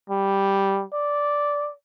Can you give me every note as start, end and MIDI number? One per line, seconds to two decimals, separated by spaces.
0.10 0.84 55
0.93 1.72 74